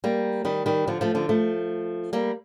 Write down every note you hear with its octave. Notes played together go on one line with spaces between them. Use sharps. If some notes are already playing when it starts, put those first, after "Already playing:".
G3 A#3
D#3 G3
D#3 G3
D3 F3
F3 A3
D3 F3
F3 A3
G3 A#3